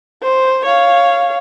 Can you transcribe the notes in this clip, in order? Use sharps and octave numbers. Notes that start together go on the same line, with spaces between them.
C5
C#5 F5